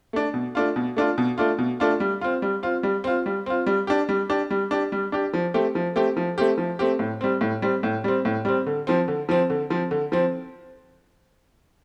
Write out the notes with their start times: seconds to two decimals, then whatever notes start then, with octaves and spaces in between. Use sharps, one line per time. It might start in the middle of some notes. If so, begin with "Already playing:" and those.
0.13 A3 D4
0.34 B2
0.55 A3 D4 F4
0.76 B2
0.96 A3 D4 F4
1.18 B2
1.38 A3 D4 F4
1.58 B2
1.80 A3 D4 F4
2.00 G3
2.21 C4 F4
2.42 G3
2.63 C4 F4
2.83 G3
3.04 C4 F4
3.26 G3
3.46 C4 F4
3.67 G3
3.87 D4 G4
4.09 G3
4.29 D4 G4
4.51 G3
4.71 D4 G4
4.92 G3
5.12 D4 G4
5.33 F3
5.54 A3 C4 G4
5.75 F3
5.96 A3 C4 G4
6.17 F3
6.38 A3 C4 G4
6.58 F3
6.79 A3 C4 G4
6.99 A2
7.21 G3 C4
7.41 A2
7.62 G3 C4
7.83 A2
8.04 G3 C4
8.25 A2
8.45 G3 C4
8.67 D3
8.87 F3 C4
9.08 D3
9.29 F3 C4
9.50 D3
9.70 F3 C4
9.91 D3
10.12 F3 C4